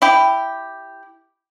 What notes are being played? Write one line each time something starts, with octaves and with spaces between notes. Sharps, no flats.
E4 G4